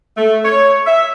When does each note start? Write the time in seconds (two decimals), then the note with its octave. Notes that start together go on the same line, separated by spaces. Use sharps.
0.17 A3
0.45 C#5
0.86 E5